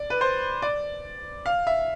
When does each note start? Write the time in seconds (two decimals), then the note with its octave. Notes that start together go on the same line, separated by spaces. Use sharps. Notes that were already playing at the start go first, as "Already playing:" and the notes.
Already playing: D5
0.10 B4
0.21 C5
0.62 D5
1.46 F5
1.67 E5